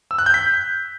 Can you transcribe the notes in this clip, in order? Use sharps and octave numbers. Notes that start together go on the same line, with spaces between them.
E6
F#6
G6
B6